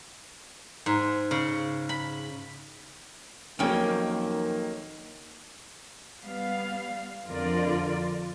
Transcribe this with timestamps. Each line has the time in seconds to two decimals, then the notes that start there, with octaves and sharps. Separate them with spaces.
0.86 G#2
1.31 C#3
1.89 B5
3.59 F2 D#3 F#3 A#3 C#4 G5
6.21 G3 B3 F5
7.25 F2 D3 F4 A#4 D5